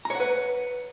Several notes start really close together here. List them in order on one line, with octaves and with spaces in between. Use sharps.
A#5 C#5 F#5 B4